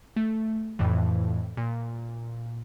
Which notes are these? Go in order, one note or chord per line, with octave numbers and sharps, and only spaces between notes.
A3
F2 A2 E3
A#2